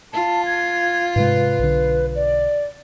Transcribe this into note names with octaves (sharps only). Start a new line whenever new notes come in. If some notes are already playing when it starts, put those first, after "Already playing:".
F4 A5
G#6
G#2 C3 G#3 B4
B1 D3
D5